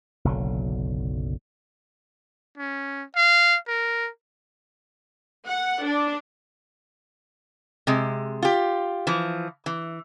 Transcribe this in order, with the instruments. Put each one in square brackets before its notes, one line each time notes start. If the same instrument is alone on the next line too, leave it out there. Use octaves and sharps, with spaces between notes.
[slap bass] F#1 B1 D3 F#3
[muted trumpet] C#4
F5
A#4
[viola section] F#5
D4
[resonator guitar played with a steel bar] C3 G#3
F4 G4
E3 F3
E3